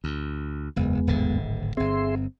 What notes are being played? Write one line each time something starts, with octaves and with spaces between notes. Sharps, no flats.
D2
F#1 E2 G#3 B3
D1 G#1 D3
G1 C4 G#4 E5 C6